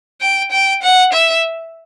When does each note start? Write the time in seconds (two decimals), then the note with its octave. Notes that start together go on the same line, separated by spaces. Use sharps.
0.21 G5
0.51 G5
0.82 F#5
1.13 E5